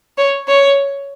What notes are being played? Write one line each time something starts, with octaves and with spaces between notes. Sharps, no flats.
C#5
C#5